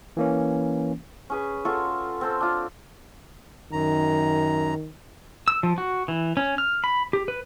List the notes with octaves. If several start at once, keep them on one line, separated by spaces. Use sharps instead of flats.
E3 A#3 C#4
C#4 G#4 B4
F4 F#4 A4 C#5
C4 A4
D4 F4
F#2 D#3 A#5
E6
F3
F#4
E3
C#4
F6
B5
G4
B4